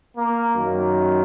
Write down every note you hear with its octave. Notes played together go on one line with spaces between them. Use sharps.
A#3
F#2 D#3